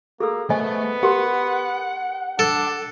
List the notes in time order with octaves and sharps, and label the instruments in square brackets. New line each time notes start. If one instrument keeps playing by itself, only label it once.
[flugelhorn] A#3 [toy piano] G#4 A4 E6
[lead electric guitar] A3 [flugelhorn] B3 [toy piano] C5 D#5 G#5
[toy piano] G4 A#4 C6 [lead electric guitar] F#5
[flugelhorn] D4 [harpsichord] A4